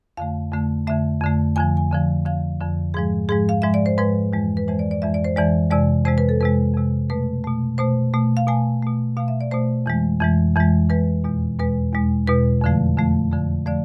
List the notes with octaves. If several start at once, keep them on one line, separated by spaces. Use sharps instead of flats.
F2 D3 A3 F5
F2 D3 A3
F2 D3 A3 E5
F2 D3 A3
F2 D3 F3 G#5
G#5
F2 D3 F3
F2 D3 F3 F5
F2 D3 F3
G#2 F3 G#3 G#4
G#2 F3 G#3 G#4
F5
G#2 F3 G#3 E5
D5
C5
G#2 F3 G#3 B4
F2 E3 G#3
B4
F2 E3 G#3 C5
D5
D5
F2 E3 G#3 E5
D5
C5
F2 E3 G#3 D5
F2 C3 G#3 D5
F2 C3 G#3 C5
B4
A4
F2 C3 G#3 B4
F2 C3 G#3
B2 A3 B4
B2 A3
B2 A3 C5
B2 A3
F5
B2 A3 G#5
B2 A3
B2 A3 F5
E5
D5
B2 A3 C5
F2 E3 G#3
F2 E3 G#3
F2 E3 G#3
F2 E3 G#3 B4
E2 B2 G#3
E2 B2 G#3 B4
E2 B2 G#3
E2 B2 G#3 B4
F2 D3 F3 A3
F2 D3 F3 A3
F2 D3 F3 A3
D3 F3 A3 D5